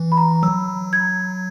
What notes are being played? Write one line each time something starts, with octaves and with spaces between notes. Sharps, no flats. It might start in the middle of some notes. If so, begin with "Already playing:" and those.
Already playing: E3
B5
A#5
F#3 E6
G#6